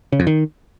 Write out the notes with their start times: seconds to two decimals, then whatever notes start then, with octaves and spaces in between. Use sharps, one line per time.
0.12 C#3
0.20 F2
0.27 D#3